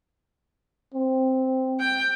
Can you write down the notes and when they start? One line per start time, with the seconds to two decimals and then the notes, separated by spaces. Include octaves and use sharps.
0.94 C4
1.80 G5